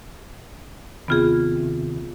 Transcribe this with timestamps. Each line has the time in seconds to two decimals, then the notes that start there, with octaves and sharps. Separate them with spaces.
1.08 D#2 C3 B3 F4 G#4